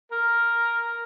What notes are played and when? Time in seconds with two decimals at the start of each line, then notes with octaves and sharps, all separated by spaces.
0.12 A#4